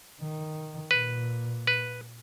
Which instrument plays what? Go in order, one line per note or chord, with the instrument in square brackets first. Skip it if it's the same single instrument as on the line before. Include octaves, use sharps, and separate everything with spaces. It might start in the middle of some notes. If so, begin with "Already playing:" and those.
[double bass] D#3
[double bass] A#2 [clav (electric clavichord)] B4
[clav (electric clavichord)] B4